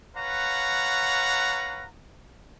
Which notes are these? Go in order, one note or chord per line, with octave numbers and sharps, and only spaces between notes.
B4 C#5 F5 F#5 A#5